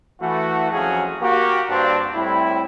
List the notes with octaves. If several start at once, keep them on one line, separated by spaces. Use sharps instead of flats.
E3 A3 F#4
F2 F3 F#3 C#4 F#4 G#4
A#3 F#4 G4
G2 C4 D4
A2 G3 C4 E4